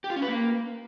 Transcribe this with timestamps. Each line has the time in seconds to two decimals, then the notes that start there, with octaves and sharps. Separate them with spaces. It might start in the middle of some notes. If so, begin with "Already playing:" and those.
0.04 G4
0.10 F4
0.16 C#4
0.22 B4
0.28 A#3